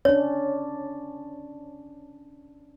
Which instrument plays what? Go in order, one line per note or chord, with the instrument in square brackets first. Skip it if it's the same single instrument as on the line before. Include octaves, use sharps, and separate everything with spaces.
[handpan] C#4 D4 [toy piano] C#5